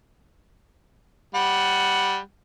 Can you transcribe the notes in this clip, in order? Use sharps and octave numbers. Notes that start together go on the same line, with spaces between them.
G3 F#5